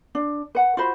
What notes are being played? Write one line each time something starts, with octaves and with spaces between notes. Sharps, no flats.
D4
B4 F#5
F4 F#4 C5 B5